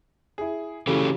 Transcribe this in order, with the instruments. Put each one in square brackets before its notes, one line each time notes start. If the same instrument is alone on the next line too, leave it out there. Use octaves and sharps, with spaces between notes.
[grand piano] E4 G#4
[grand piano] C#3 E3 F#3 [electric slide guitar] C#4 G4 A4